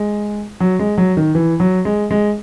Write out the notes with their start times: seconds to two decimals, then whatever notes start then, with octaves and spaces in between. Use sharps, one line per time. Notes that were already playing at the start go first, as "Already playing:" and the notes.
Already playing: G#3
0.60 F#3
0.79 G#3
0.98 F#3
1.17 D#3
1.35 E3
1.60 F#3
1.85 G#3
2.11 G#3